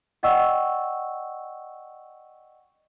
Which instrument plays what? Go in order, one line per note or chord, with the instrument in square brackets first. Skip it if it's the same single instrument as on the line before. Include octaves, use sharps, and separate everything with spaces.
[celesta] D5 D#5 F#5 G5 C#6 E6